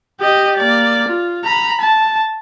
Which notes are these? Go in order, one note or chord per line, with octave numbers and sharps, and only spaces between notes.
G4 D#5
A#3 D5
F4
A#5 B5
A5